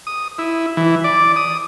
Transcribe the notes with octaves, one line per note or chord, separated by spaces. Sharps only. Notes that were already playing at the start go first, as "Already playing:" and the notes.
D#6
E4
E3
D5
D#6